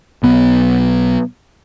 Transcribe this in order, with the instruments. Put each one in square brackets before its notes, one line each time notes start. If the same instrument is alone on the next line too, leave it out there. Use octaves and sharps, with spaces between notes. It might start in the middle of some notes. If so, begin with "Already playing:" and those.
[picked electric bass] B1 B3